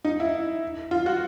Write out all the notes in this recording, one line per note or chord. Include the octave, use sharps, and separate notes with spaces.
D#4
E4
F4
F#4